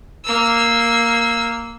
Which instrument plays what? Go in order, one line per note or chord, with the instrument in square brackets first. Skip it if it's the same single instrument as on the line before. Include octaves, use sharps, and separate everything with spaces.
[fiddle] A#3 E6